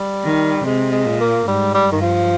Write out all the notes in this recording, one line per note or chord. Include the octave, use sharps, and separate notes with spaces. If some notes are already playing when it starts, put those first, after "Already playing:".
Already playing: G3
D#3
C3 G#3
G#3
A#2
A#3
G#2 G3
G3
G2 D#3
F3